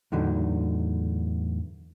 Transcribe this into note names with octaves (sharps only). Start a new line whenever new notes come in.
E2 A2 D3 F#3 D#4